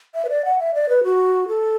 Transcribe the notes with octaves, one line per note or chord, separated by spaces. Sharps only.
E5
B4
D5
F#5
E5
D5
B4
F#4
A4